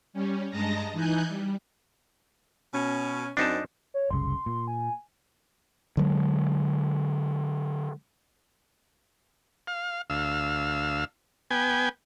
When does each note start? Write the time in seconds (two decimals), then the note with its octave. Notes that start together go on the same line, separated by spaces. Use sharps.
0.13 G3 C#4
0.50 G2 G#3 D#5 A5 A#5 A#6
0.93 E3 D#4 G#5 F#6 G6
1.28 G3
2.73 B2 C#4
3.37 F#2 C4 D4 D#4 A5
3.94 C#5
4.11 F#1 C2 C#3 C6
4.46 A#2
4.67 G#5
5.97 D3 F#3 G#3
9.67 F5
10.10 D2 F5 E6
11.50 B3 G5 G#5